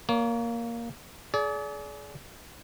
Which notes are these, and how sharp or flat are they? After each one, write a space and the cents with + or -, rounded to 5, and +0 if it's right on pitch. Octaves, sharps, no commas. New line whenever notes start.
A#3 +0 C#5 +35
G#4 +30 D5 -30